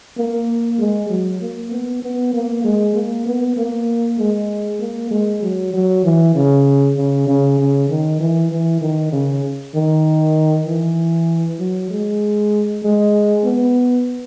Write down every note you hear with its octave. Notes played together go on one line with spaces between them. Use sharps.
A#3
G#3
F#3
A#3
B3
B3
A#3
G#3
A#3
B3
A#3
G#3
A#3
G#3
F#3
F#3
E3
C#3
C#3
C#3
C#3
D#3
E3
E3
D#3
C#3
D#3
E3
F#3
G#3
G#3
B3